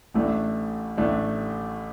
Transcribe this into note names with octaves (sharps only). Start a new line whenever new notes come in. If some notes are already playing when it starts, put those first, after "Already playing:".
A1 A2 A3 D4
A1 A2 A3 D4